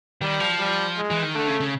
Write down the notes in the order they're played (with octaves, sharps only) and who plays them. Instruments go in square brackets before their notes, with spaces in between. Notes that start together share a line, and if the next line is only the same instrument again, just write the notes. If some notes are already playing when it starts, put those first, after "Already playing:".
[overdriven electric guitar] D#3 [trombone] G3
[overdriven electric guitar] F3
[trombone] G3
G#3
[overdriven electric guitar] E3
D#3
[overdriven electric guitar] D3 [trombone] A3
[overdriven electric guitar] C#3
C#3